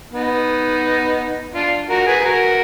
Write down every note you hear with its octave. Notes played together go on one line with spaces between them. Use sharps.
B3 D#4
D4 F4
F#4 A#4
G#4 B4
F#4 A#4